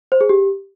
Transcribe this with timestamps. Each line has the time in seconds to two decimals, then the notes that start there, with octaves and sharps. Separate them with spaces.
0.12 C5
0.21 G#4
0.29 G4